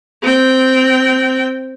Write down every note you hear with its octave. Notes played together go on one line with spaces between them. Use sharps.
C4 G5